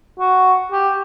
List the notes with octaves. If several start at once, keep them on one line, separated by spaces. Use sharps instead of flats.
F#4
G4